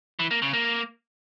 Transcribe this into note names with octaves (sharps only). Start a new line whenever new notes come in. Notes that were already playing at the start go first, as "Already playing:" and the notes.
E3
A#3
C#3
A#3